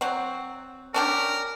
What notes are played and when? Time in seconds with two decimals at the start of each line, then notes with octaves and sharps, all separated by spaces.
0.01 F#3 C4
0.94 C#4 D4 G4 A#4